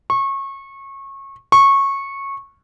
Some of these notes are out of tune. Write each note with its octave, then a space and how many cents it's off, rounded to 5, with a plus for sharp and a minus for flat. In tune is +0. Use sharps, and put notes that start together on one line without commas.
C#6 -25
C#6 -15